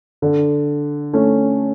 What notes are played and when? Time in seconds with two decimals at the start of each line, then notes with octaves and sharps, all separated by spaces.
0.22 D3
1.13 A3 C#4